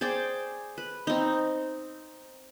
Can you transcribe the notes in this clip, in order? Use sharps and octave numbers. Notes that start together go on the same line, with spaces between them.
G#4 C5 D5 G5
B4
C4 D#4